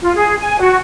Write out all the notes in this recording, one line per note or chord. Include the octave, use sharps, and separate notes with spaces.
F4
G#4
G#5
F#4